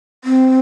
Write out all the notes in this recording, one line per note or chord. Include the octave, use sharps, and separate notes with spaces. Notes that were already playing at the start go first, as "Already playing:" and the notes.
C4